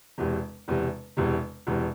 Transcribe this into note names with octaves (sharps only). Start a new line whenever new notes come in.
E1 E2 C3
E1 E2 C3
E1 E2 C3
E1 E2 C3